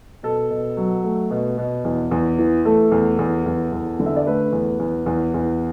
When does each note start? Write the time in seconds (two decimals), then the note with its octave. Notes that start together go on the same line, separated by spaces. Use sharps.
0.23 B2 A4
0.51 B2
0.77 F#3
1.04 A3
1.31 B2
1.58 B2
1.85 E2
2.11 E2
2.39 E3
2.65 A3 A4
2.92 E2
3.19 E2
3.46 E2
3.73 E2
4.00 D3
4.06 E5
4.16 D5
4.27 A3 B4
4.53 E2
4.80 E2
5.06 E2
5.34 E2